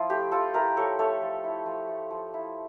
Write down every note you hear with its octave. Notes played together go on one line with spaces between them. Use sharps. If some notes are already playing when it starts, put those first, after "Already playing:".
Already playing: F3 E4 F4
A3 G4
F3 F4 A4
E4 G4 A#4
F3 A4 C#5
A3 A4 C#5
F3
E4
F3
A3
F3
E4